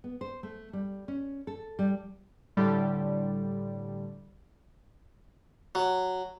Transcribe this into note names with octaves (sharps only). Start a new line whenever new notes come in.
B3
C5
A3
G3
C#4
A4
G3
A2 D3 G3
F#3